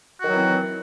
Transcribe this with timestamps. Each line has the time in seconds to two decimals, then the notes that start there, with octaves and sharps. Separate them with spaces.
0.19 F#4
0.23 D#3
0.27 F#3
0.31 E3
0.35 C4